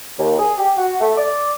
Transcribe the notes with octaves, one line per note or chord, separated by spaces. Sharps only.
D#2
G#4
G4
F#4
A3
D5